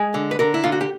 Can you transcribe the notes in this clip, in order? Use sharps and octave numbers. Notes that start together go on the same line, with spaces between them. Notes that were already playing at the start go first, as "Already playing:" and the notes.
Already playing: G#3 G#4
D3
B4
D3 A#4
E4
D3 F4
F#4
G4